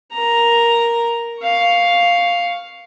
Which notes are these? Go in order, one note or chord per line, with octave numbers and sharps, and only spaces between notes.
A#4 A#5
F5 C#6